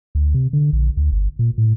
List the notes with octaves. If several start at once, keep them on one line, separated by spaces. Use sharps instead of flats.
D2
C3
D3
A#1
D2
G1
A#2
A2